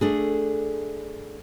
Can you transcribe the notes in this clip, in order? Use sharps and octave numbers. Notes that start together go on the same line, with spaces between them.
A3 D4 G#4